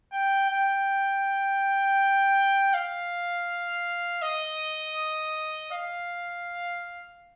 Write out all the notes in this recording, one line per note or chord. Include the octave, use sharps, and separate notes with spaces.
G5
G5
F5
D#5
F5